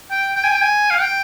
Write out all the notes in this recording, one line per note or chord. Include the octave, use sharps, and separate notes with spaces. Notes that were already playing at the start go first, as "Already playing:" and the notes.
G5
G5
G#5
G5
G#5
F5
G5